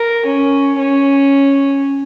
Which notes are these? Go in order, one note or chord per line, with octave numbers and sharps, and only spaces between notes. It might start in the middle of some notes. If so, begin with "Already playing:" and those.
Already playing: A#4
C#4
C#4